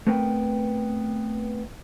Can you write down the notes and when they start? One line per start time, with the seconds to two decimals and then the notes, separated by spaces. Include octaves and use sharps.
0.07 A3 B3 C4 A#4 B4 G5